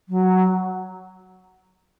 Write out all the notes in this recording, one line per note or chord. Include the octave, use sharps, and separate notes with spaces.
F#3